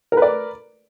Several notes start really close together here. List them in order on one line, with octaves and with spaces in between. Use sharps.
A#4 B4 D5